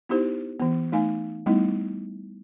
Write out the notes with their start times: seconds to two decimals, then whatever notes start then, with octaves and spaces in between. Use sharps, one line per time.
0.09 B3 D#4 E4 G4 C5
0.60 E3 B3
0.92 A3 D#4 F5 G#5
1.46 G3 A3 B3 D#4 E4